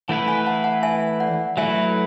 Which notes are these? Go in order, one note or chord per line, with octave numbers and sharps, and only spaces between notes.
E3 A3 E4 B4 F#5 A5
G#5 B5
F#5 A5
F#5 A5
E5 G#5
D5 F#5
F#3 A3 E4 B4 E5 G#5